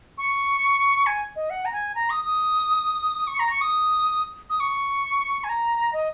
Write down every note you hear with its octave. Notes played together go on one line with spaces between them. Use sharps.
C#6
G#5
D#5
F#5
A#5
G#5
A#5
D#6
D#6
C#6
A#5
C#6
D#6
D#6
C#6
G#5
A#5
D#5